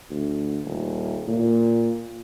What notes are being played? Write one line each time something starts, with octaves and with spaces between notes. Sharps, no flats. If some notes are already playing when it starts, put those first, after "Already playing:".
D2
D#1
A#2